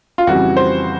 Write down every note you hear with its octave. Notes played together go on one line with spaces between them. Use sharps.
F4
F2 C#3 E3 G3 F#4
C5